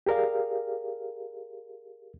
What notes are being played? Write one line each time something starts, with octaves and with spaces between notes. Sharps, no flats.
G4 G#4 A#4 D5 F5